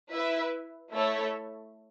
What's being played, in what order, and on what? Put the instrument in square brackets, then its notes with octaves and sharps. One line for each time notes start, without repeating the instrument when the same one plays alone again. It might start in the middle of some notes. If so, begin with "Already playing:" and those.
[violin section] E4 B4 E5
A3 E4 A4 C#5 E5